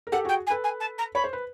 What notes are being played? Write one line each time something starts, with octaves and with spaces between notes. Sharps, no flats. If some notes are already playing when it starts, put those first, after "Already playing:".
A#4
G4 A4 F#5
F#4 G#4 G5
G#5
A4 B4
G#5
A5
A#5
C#5 B5
C5
B4